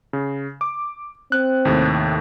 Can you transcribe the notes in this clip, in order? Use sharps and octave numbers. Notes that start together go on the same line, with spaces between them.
C#3
D6
C4 F#6
D#2 A2 C3